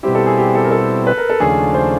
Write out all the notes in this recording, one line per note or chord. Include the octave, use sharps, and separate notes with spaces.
B2 G3 C4 E4 G4
A4
G#4
G4
A4
A#4
A4
B4
A#4
A4
D#2 C#3 F3 A3 D4 G#4
C5